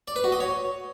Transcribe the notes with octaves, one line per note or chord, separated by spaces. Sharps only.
D5
B4
F#4
D#5
C#5